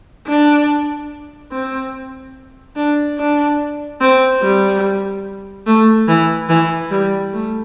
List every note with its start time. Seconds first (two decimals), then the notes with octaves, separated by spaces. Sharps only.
0.28 D4
1.52 C4
2.76 D4
3.18 D4
4.01 C4
4.42 G3
5.66 A3
6.08 E3
6.49 E3
6.91 G3
7.33 A3